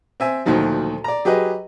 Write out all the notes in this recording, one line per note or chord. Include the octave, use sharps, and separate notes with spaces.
C4 E5 G#5
D2 A#2 D#3 F3 F#3
D5 A#5
F#3 G4 G#4 B4 D#5